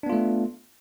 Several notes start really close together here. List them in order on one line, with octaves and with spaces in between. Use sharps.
D4 B3 F4 A3